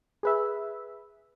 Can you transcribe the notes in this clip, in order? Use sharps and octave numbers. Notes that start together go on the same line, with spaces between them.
G#4 B4 E5